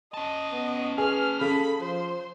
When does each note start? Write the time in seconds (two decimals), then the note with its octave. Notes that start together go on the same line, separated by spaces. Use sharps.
0.14 C#4 D#5 A5
0.52 B3
0.98 G#4 B4 F6
1.41 C#3 A4 B5
1.80 F3 C5